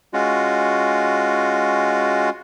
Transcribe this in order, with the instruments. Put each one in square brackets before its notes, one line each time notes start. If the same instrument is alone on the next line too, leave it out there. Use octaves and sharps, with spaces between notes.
[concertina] G#3 C#4 F4 F#4